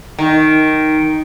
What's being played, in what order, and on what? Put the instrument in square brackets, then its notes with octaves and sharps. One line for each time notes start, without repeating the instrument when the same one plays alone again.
[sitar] D#3